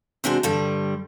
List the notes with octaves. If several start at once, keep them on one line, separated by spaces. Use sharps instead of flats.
C3 G#3 D4 F#4 C5
G2 D3 G3